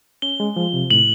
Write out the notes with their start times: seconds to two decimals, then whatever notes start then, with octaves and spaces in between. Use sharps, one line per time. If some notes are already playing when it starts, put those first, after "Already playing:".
0.22 C#4 G7
0.40 G#3
0.56 F3
0.73 C3
0.91 A2 F#7